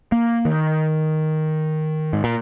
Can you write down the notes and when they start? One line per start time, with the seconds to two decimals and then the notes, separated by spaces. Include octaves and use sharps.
0.12 A#3
0.45 D#3
2.13 G#2
2.24 A#2